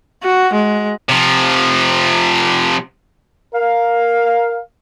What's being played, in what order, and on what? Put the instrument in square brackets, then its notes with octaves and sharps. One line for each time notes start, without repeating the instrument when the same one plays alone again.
[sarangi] F#4
G#3
[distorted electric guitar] C3 F3
[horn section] A#4 F5